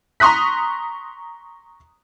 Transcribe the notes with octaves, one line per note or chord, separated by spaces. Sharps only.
A#5 C6 C#6 D#6 F#6 B6